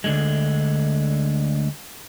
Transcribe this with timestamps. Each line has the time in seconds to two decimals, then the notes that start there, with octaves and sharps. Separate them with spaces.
0.04 D2 D3 G#3